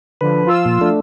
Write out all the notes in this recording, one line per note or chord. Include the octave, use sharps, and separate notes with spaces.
D3 F3 B4
F3 F4 E6
A#2
A3 D4